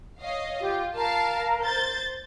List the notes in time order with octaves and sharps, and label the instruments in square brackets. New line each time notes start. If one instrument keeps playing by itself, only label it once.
[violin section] C#5 D#5 F5
[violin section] F4 [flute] G4
[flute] A#4 [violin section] F5 A5
[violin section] C5 G6 A6